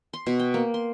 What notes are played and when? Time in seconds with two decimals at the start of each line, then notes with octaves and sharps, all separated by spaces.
0.13 C6
0.26 B2
0.39 G5
0.54 A#3
0.74 C6